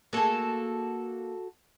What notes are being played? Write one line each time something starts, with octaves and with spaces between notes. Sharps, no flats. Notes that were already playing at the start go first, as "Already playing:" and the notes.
A#3 F#4 G#4 A4